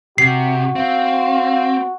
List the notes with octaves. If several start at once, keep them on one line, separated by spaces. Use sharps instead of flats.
C3 F#4 C7
C4 F5